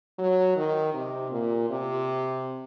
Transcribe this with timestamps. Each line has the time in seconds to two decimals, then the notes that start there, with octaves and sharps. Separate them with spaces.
0.19 F#3
0.57 D#3
0.94 C3
1.32 A#2
1.70 C3